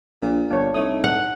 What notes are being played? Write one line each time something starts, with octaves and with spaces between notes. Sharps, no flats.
A#1 A#2
G1 D4 C#5
C2 A3 D#4 C#5 D#6
F#5